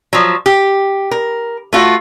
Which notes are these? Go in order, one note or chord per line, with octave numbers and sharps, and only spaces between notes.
F3 F#3
G4
A#4
A3 F4 F#4